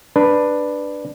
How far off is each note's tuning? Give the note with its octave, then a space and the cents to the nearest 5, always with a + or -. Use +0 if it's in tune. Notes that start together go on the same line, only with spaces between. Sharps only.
D4 +10 B4 +0